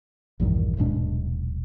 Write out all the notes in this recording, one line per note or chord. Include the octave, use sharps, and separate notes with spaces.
A#1 E2 G2 D#3
D#1 B1 G#2 D4